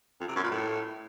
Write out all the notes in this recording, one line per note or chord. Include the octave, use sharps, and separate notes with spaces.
F2
C3
F#2
A#2
A2